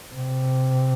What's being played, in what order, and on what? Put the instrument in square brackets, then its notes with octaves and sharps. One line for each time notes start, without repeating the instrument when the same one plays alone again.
[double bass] C3